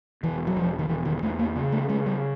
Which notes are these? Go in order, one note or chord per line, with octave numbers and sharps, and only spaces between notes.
E1 E3
F#3
E1 F3
D#3
E1 E3
D#3
E2 A3
A#3
C#3
A3
C#3 G#3
G3